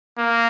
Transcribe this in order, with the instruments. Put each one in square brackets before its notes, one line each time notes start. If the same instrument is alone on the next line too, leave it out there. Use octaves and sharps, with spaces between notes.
[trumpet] A#3